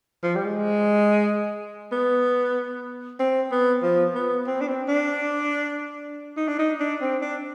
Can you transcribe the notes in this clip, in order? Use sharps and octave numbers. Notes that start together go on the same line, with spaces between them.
F3
G3
G#3
B3
C4
B3
F3
B3
C4
D4
C4
D4
D#4
D4
D#4
D4
C4
D4